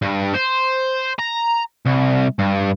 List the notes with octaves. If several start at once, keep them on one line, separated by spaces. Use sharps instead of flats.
G2
C5
A#5
C2
G2